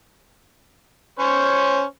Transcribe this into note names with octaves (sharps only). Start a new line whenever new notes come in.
C#4 C5 C#5